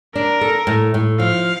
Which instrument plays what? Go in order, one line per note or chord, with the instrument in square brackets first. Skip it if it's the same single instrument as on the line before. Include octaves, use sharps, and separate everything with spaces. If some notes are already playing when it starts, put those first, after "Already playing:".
[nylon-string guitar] D4 [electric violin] A#4
[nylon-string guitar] A4
A2
A2
[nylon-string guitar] F3 [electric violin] F5